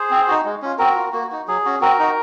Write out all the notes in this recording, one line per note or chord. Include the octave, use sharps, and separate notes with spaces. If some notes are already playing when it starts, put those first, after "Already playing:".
Already playing: G#4 C5
C4
D#4 F#4
G#3
C#4 F4
C4 F#4 A#4
F4
A#3 F#4
D#4 F#4
F#3 G#4
C#4 F#4
C4 F#4 A#4
D#4 F#4